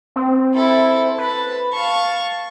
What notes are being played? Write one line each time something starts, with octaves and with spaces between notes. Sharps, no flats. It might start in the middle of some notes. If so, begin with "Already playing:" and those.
C4
E4 A4
B4 A5 B5
F5 A5 C#6